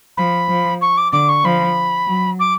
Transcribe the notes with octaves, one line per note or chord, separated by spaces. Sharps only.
F3 B5
F3
C#6
D6
D3 D6
C#6
F3 B5
F#3
D6